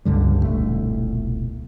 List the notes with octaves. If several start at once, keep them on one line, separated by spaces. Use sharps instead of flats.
C#2 G2 D3 G3
E1 C2 A#2 A3